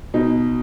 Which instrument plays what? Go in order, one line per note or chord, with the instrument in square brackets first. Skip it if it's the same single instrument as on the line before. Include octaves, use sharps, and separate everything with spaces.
[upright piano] B2 D#4